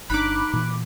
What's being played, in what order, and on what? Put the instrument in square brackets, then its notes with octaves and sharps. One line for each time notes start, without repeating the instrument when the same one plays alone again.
[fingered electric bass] G1 D4 [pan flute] D#4 [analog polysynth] B5 D6 [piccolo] F#6
[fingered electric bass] A#2 E3